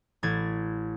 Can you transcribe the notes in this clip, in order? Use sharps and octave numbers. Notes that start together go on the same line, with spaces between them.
A1 G#6 A6